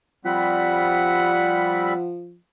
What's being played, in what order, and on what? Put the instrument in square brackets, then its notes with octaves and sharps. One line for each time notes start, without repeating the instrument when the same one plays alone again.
[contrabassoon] F3 [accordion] G3 C4 B5 [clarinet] F#5